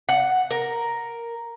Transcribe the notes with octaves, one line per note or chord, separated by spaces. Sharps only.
F#5
A#4